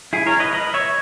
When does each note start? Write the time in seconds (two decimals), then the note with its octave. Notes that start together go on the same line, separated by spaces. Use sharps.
0.13 E4 G#4
0.26 A#4 C#5
0.40 B4 D#5
0.53 B4 D#5
0.74 C#5 E5